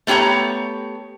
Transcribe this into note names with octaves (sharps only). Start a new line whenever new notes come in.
A3 B3 G4 C#5 A#5